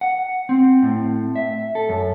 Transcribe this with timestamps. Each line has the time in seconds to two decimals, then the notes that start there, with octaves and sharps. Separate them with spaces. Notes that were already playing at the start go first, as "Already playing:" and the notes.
0.01 F#5
0.49 C4
0.82 A2
1.36 E5
1.75 A4
1.89 F#2